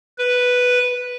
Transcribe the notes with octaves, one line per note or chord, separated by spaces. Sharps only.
B4